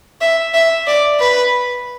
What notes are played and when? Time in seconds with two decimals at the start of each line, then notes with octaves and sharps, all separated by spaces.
0.21 E5
0.54 E5
0.87 D5
1.20 B4